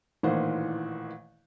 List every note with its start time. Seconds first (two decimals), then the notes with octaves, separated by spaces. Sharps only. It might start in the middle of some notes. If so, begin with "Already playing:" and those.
0.23 A1 A#2 D#3 E3 C5 F#5